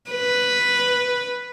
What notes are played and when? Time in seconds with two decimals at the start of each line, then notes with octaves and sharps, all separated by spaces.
0.11 B4